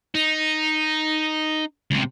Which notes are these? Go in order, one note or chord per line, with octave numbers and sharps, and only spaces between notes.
D#4
C#2 C3